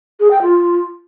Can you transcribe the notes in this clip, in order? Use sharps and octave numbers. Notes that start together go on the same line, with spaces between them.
G#4
G5
F4